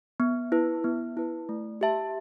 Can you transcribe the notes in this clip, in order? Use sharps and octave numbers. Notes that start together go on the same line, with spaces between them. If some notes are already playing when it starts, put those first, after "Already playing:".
B3
E4 B4
B3
E4 B4
A3
G4 E5 A5